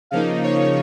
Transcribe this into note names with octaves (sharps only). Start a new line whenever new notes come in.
C#3 F3 A#3 D#4 F5
C#5